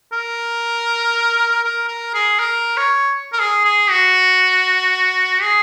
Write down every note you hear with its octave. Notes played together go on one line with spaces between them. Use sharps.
A#4
A#4
A#4
G#4
A#4
C#5
A#4
G#4
G#4
F#4
G#4